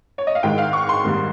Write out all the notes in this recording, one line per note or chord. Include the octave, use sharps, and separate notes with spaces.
C#5
D#5
F5
G#2 D#3 G#3 G5
F5
C#6
C6
G#2 D#3 G3 A#3